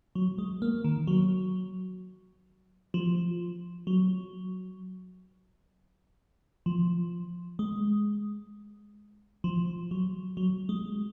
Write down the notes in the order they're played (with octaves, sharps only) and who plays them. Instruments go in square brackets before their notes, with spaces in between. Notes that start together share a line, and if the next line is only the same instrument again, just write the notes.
[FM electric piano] F#3
G#3
A#3
D#3
F#3
F3
F#3
F3
G#3
F3
F#3
F#3
G#3